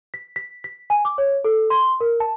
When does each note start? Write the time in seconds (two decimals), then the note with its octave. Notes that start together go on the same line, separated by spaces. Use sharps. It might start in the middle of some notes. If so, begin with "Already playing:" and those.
0.14 B6
0.36 B6
0.64 B6
0.90 G#5
1.05 D6
1.18 C#5
1.44 A4
1.70 C6
2.01 A#4
2.20 A5